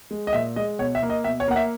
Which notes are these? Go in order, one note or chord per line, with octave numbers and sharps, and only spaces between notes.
G#3
D#5
A#2 E5
G#3 D#5
B2 C#5
E5
A#3
D#5
B2 E5
C#5
A#3 F#5
E5